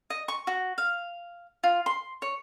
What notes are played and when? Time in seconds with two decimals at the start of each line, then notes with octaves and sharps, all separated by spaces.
0.10 D#5
0.28 C#6
0.47 F#4
0.78 F5
1.63 F4
1.86 C6
2.22 C#5